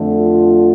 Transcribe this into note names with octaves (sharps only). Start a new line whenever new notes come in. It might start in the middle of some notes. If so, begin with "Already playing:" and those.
Already playing: F2 D3 A3
F4